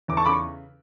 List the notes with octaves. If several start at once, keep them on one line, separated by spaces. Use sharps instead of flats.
E2 D6
A5 C#6
C#3 B5 D6
C#6